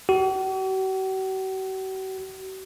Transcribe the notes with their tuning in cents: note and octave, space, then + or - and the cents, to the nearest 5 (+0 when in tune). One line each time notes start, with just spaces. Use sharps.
F#4 +45